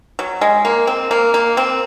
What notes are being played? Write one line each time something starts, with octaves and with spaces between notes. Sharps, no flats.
F#3
G#3
A#3
C4
A#3
A#3
C4